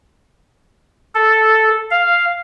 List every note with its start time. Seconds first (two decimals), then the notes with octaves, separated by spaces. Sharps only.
1.15 A4
1.90 F5